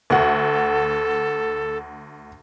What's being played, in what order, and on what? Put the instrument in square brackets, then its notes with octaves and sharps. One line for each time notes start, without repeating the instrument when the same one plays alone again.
[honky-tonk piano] D2 F#5 [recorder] A4